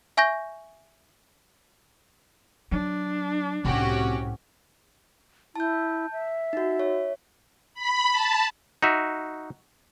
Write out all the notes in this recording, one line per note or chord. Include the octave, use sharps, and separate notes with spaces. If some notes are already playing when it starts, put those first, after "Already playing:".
E5 G#5 C#6 G6 A#6
F#3 D4
C2 A2 C3 C4 C#4 F#4 G4
E4 A5 G6
E5
D#4 F#4
C#5
B5
A5
D#4 F#4 E5